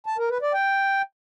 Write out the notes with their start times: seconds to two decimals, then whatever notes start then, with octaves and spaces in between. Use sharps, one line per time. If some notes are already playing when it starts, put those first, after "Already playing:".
0.06 A5
0.18 A#4
0.30 B4
0.42 D5
0.54 G5